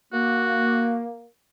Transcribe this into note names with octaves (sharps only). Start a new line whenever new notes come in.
A#3 F#4